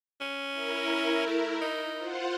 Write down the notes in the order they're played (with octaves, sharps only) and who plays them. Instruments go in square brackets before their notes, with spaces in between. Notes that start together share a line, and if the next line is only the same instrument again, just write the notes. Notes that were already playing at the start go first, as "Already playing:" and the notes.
[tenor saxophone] C#4
[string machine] E4 A#4
[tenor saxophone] A3
D#4
[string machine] F4 C5 F#5